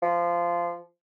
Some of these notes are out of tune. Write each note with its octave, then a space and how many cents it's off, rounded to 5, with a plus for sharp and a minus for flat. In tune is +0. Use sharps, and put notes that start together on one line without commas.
F3 -15